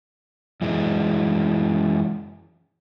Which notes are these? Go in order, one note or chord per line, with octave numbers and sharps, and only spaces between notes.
F#2 E3 G#3